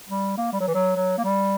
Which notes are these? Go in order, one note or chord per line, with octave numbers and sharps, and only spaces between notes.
G3
A#3
G3
F#3
E3
F#3
F#3
A#3
G3